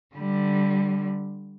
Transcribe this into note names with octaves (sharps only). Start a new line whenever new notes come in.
D3 G3